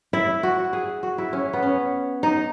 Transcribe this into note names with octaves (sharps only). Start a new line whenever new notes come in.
E4
F#4
G#4
F#4
E4
C#4
B3
C#4
D#4